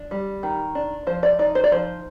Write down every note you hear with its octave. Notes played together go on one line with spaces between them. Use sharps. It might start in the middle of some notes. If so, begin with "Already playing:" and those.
Already playing: D4
G3
D#3
D4
F3 C5
D5
D#4 D5
C5
D5
F3 C5